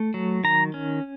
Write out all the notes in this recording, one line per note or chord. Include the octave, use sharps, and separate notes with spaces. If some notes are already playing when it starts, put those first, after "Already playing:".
Already playing: A3
F#3
D#3 A#5
C#4